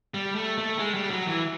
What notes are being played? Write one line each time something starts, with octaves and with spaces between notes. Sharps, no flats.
G3
A3
A3
G#3
G3
F#3
E3